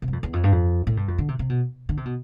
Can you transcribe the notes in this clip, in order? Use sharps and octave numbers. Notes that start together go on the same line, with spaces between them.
C3
G2
F2
E2
F2
G2
F2
A2
G2
F2
D3
C3
C3
B2
D3
C3
B2